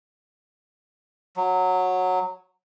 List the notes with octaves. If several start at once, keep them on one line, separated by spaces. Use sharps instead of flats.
F#3